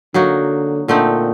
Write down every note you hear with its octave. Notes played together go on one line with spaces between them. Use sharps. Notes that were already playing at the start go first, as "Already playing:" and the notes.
D3 F#3 A#3 D#4 F#4
A#2 D3 A3 C4 D#4